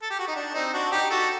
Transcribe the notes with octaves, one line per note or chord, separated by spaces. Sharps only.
A4
G4
F#4
D#4
D4
C4 D#4
D4 F#4
D#4 G4
F#4 A4